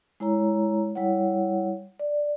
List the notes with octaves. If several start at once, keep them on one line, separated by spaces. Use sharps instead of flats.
G#3 E4 C#5 A#5
G3 E4 C#5 F#5
D5